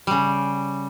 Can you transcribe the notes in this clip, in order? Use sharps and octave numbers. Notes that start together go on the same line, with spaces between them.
C#3 G3